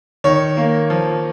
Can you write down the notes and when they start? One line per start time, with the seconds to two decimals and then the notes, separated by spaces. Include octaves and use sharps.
0.24 D#3 C#5
0.57 A#3
0.90 F3